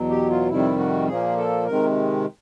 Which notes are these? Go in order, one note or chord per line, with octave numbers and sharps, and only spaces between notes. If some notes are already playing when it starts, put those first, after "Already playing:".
Already playing: E2 B2 F#3
G4
F4
F2 C3 D#3 G3 E4
F#4
A#2 F3 A#3 G#4
A4
C3 D#3 G#3 A#4